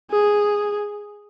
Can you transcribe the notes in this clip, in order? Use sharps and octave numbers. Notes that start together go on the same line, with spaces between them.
G#4